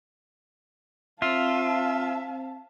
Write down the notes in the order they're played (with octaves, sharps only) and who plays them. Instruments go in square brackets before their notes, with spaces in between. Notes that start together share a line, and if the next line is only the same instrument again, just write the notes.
[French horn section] C4 [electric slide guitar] F4 [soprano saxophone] E5 [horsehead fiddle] F5 A5